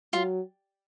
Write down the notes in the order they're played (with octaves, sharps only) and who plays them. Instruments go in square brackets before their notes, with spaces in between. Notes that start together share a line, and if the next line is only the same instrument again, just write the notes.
[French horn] F#3 [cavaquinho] F4